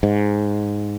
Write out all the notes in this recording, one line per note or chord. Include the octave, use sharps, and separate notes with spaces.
G#2